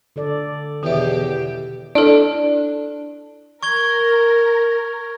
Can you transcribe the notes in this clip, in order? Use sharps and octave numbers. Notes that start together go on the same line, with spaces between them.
D3 A4 D5
E2 B2 D#3 G4 E5
D4 E4 A4
A#4 C#6 G#6 G7